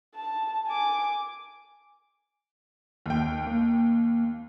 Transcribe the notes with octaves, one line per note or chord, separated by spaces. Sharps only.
A5
G#5 D6
D#2 G5
A#3